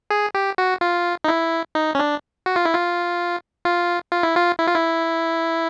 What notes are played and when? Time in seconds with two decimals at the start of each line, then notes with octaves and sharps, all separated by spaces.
0.10 G#4
0.35 G4
0.58 F#4
0.81 F4
1.24 D#4
1.28 E4
1.75 D#4
1.95 C#4
1.99 D4
2.46 F#4
2.56 F4
2.65 E4
2.74 F4
3.65 F4
4.12 F4
4.23 E4
4.36 F4
4.59 E4
4.67 F4
4.75 E4